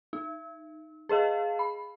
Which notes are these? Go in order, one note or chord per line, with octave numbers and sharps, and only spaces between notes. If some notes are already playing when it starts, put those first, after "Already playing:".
D#4
G#4 B4 D#5 F5
B5